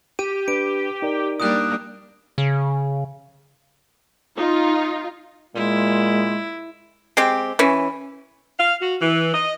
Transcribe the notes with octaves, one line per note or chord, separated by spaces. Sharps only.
G4 D#7
D4 B4 D7
D#4 A#4 D5
G3 A#3 D4 D#6 F#6
C#3
D#4 F4
A#2 G#3 E4
G#3 C4 G4
E3 C#4
F5
F#4
E3
D#5